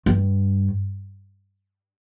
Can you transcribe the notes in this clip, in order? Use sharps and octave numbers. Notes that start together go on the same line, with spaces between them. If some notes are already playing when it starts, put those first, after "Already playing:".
G2